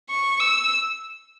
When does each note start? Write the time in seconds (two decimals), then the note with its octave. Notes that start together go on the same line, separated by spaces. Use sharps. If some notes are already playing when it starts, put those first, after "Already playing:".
0.10 C#6
0.40 E6